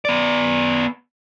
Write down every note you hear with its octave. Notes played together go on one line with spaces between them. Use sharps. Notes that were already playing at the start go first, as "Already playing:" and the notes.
B3 D5